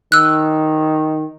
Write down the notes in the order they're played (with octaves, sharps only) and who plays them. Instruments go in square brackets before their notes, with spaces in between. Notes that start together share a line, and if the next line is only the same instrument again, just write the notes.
[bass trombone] D#3 [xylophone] E6 F#6